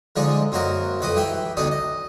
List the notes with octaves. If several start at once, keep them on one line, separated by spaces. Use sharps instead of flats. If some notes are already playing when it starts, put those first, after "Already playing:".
D3 F3 G#3 D#4 G#4 D5
F#2 A#3 C4 F#4 A#4 D#5
B1 F2 B4 D#5 D6 D#6
E3 G4 E5 G5 B5
D2 B2 D4 D#4 D5 D#6
D#5